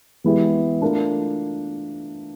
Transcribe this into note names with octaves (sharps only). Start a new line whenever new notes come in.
E3 G#3 B3 E4 G4
A3 D4 F4 A#4